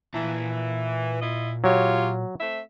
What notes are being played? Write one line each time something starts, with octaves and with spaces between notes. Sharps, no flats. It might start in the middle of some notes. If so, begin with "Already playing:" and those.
A#2 E3 A5 A#5
E4 F4 D#5
F#3 F4 G4 C#5
A3 C4 E5